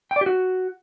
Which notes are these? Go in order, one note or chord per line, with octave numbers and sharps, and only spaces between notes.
G5
D5
G4
F#4